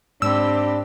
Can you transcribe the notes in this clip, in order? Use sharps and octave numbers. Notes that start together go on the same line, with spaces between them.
G#2 C4 D4 G4 B5 E6